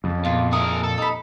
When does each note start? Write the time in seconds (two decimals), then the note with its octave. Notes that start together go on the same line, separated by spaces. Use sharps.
0.04 F2 C#3
0.25 E2 A#2 F4
0.53 E4 G#4 A#4 D#6
0.84 A4
0.98 D#4 B5